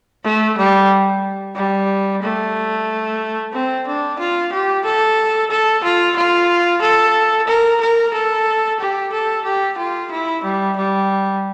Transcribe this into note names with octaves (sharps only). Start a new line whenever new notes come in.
A3
G3
G3
A3
C4
D4
F4
G4
A4
A4
F4
F4
A4
A#4
A#4
A4
G4
A4
G4
F4
E4
G3
G3